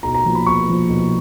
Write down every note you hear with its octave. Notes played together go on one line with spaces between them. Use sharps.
B1 A#5
A#5
A#2 F3
B5
B1 C#6
A#2 F3
B1